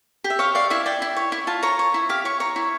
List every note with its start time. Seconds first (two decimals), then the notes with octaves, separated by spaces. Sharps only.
0.24 G4
0.30 E5
0.39 C#5 F5
0.55 D5 F5
0.70 E4 E5
0.86 D5 G5
1.02 E4
1.16 C#5
1.32 E4
1.47 F4 A5
1.63 C#5 A#5
1.79 C#5
1.94 E4
2.09 G4 F5
2.25 C#5 C#6
2.40 C#5 A#5
2.56 E4